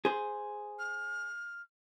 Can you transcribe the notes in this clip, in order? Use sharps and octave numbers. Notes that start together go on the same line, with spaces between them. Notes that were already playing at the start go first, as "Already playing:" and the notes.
G#4 C5
F6